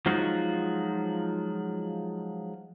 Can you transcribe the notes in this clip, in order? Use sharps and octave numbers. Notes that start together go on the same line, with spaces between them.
F3 F#3 G#3 D#4 F4 F#4